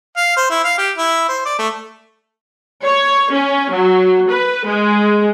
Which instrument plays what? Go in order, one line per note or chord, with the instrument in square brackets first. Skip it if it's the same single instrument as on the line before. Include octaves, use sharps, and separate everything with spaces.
[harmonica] F5
C5
E4
F5
G4
E4
C5
D5
A3
[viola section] C#5
C#4
F#3
B4
G#3